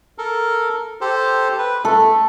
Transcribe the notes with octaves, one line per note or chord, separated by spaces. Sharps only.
A4 A#4
G4 A4 C5
B4
A3 A4